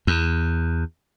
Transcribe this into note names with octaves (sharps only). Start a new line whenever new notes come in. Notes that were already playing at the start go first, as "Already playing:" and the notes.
E2